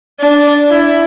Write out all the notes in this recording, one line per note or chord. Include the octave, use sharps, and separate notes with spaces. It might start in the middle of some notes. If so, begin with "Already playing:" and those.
D4
E4